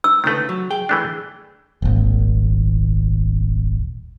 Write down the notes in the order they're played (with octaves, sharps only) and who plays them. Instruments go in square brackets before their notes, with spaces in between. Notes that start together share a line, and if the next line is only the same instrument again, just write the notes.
[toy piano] E6
[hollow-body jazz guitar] C#2 D3 B4 [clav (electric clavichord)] D#3 A3
[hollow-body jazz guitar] F#3
G#4 G5
[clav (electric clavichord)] E3 A3 D4
[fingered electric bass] D#1 G#1